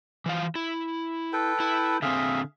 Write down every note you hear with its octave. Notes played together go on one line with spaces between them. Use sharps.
E3 F3 F5
E4
A4 B4 G5
E4
D3 C4 G#4 E5 F5